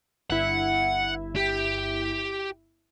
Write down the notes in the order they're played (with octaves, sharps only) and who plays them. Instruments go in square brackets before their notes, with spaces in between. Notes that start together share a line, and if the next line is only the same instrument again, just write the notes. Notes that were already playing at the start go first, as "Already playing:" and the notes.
[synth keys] G1 E4 [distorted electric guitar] F#5
[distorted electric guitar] G4